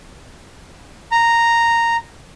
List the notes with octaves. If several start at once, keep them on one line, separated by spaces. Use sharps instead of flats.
A#5